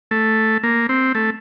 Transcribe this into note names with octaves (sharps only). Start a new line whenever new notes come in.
A3
A#3
C4
A3